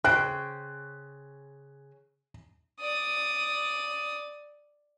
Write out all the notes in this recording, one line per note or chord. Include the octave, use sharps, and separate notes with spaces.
C#3 C5 G5 F#6
D5 D#6